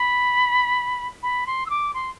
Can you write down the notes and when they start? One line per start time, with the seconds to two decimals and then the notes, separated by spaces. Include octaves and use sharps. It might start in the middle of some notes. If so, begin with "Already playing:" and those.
Already playing: B5
1.23 B5
1.47 C6
1.66 E6
1.70 D6
1.94 C6